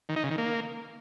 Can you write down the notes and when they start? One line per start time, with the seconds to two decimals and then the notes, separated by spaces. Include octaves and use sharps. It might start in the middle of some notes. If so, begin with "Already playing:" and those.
0.09 D#3
0.16 D#4
0.23 C#3
0.31 D#3
0.38 A#3